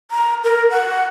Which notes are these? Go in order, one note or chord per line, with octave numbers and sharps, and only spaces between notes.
A#5
A#4
F#5